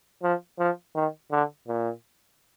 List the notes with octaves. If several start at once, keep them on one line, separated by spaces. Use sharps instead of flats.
F3
F3
D#3
D3
A#2